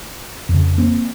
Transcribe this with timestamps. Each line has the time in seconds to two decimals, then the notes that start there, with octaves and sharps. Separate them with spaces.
0.49 F2
0.54 C#3
0.78 A#3 C4